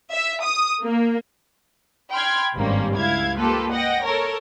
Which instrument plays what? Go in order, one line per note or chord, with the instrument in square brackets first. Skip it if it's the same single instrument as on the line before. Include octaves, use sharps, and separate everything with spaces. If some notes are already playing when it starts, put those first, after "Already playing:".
[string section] E5
D#6
A#3
G5 B5 C6 F6 G#6
G#1 G2 G3 A#3 C4 C#4
C#2 E4 F5 G#6
A#3 F4 G4 A4 B4
D#5 F#5 G5 A#6
A4 A#4 C#5